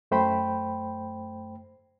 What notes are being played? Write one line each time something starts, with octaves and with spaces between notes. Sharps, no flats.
F#2 A3 C5 G5 B5